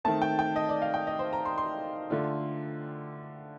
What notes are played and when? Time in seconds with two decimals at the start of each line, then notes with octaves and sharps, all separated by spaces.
0.04 D#3 A3 C4 A5
0.22 G5
0.39 G5
0.56 D#5
0.69 D5
0.82 F5
0.94 G5
1.07 D#5
1.19 C5
1.33 A#5
1.45 C6
1.58 C6
2.10 D3 A3 D4 F4